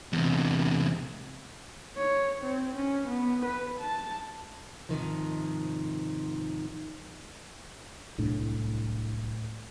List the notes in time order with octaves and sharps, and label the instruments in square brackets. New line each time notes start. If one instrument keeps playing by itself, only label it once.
[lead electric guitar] E2 C3
[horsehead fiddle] C#5
C4
C#4
B3
B4
A5
[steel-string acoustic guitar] G#2 C3 D#3 F3
[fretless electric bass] D1 C2 A2 D4